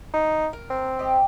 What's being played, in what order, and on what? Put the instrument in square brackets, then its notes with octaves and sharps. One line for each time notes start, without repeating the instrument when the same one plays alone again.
[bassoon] D#4
[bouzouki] A#4
[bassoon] C4
[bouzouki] G4 D#5